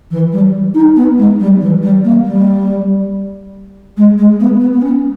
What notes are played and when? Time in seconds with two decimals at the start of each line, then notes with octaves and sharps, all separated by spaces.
0.10 E3
0.32 G3
0.74 D#4
0.95 B3
1.17 G#3
1.39 G3
1.60 E3
1.82 G3
2.04 A#3
2.24 G3
3.97 G#3
4.17 G#3
4.40 B3
4.60 B3
4.73 B3
4.81 C#4